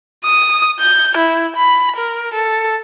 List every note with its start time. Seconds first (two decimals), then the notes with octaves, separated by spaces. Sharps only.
0.25 D#6
0.80 G6
1.18 E4
1.56 B5
1.96 A#4
2.34 A4